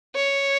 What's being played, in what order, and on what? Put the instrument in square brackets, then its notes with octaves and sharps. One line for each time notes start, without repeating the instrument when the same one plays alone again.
[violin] C#5